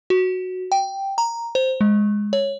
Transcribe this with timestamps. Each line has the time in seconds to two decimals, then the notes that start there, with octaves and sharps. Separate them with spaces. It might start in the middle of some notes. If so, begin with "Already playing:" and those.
0.10 F#4
0.72 G5
1.18 A#5
1.55 C5
1.81 G#3
2.33 C#5